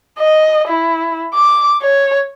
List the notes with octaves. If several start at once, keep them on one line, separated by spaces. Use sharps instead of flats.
D#5
E4
D6
C#5